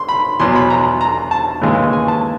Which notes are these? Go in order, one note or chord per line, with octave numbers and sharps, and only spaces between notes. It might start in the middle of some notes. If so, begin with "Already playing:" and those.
Already playing: C6
B5
E2 B2 F#3 C6
B5
A#5
A#5
A5
D#2 C#3 E3 G#3
G#5
A5